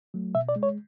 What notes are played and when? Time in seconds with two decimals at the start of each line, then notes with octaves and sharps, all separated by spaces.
0.14 F#3 A3
0.35 B2 E5
0.49 D5
0.56 G#3
0.63 C#5